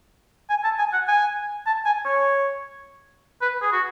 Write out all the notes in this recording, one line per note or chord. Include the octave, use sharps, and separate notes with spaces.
G#5
A5
G#5
F#5
G#5
A5
G#5
C#5
B4
G#4
F#4